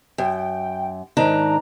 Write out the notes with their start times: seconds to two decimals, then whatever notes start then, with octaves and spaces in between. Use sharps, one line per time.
0.18 F#2 G5
1.17 G#2 D#3 D4 A#5